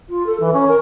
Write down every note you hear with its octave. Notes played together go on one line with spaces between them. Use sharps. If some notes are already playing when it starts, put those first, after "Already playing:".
F4
A4
E3
C#4
A#4